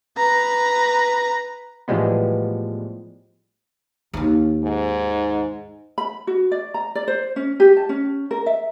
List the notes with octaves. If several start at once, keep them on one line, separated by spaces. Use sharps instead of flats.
B4 A#5
A2 E3 F3 G3 G#3 B3
D#2 D#3
G#2
B5
F#4
D5
A#5
D5
C5
C#4
G4
A5
C#4
A#4
E5